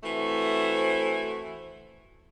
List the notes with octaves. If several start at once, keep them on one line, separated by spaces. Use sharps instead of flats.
E3 A3 C4 F#4 C5